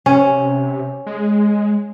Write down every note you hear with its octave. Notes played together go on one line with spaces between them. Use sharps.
C3 C#4
G#3